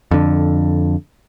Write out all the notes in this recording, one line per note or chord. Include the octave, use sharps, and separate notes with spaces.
F2 D3